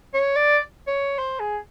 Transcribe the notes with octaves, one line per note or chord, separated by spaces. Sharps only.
C#5
D5
C#5
C5
G#4